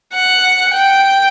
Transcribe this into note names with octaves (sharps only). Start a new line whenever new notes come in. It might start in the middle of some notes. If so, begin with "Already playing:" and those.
F#5
G5